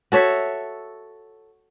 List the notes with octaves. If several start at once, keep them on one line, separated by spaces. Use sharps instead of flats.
F#4 A4 C#5 E5